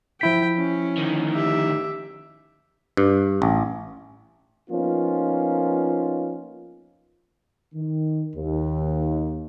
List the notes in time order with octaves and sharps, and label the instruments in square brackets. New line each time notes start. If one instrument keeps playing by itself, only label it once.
[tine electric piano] F3 E4 B6 [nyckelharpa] G5
[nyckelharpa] C#4
[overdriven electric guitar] D2 D#3
[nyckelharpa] G4 E5
[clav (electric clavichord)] G2
A1
[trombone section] F3 A#3 B3 C#4 D#4 F4
D#3
D#2